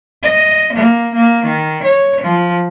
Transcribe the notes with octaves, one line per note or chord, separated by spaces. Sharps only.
D#5
A#3
A#3
D#3
C#5
F3